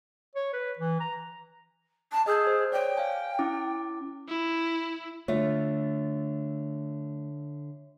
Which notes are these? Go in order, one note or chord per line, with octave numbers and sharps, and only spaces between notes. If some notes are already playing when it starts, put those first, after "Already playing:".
C#5
B4
E3
A#5
A5
G#4 D#5 E6 G6
C5
C#5 D5 G5
F5 G#5
C#4 E4 D6
E4
D3 A3 F4 C#5 E5